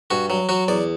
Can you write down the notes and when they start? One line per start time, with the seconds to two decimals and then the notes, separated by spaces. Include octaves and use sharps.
0.11 G2 F#4
0.30 F#3
0.49 F#3 F#4
0.68 E2 D5